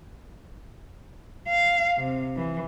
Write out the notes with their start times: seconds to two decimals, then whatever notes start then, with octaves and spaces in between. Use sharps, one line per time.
1.48 F5
1.97 C3
2.36 E3